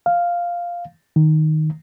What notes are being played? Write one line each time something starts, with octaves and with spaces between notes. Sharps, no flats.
F5
D#3